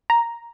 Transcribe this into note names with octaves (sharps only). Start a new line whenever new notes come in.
A#5